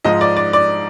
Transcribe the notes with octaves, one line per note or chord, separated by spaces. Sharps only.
G#2 F3 D#5
D5
D5
D5